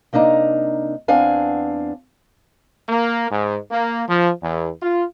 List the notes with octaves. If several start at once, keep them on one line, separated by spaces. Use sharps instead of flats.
C3 A#3 D4 D#4 A#5
E2 B3 C4 D4 F5 G#5
A#3
G#2
A#3
F3
E2
F4